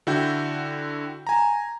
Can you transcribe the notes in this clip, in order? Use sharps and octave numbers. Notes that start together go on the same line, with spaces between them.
D3 E4 F#4 G5 G6
G#5 A#5